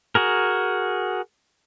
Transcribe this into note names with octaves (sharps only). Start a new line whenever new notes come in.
F#4 G#4 A#4